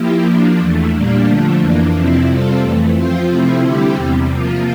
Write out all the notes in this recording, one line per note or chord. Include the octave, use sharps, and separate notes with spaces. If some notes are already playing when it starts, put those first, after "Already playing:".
Already playing: F3 A#3 E4 G4
F3 A#3 D4
E2 E3 A3
A#2 G3 A#3 D4
D3 F3 A3 D4
F2 E3 A#3 D4
F2 C3 F3 C4 E4
C3 G3 C4 F4 A4
F2 E3 A3
F3 C4 F4 C5
C3 F3 A3 C4 E4
D3 G3 C4 E4 G4
E2 C3 G3
C3 F3 A#3 F4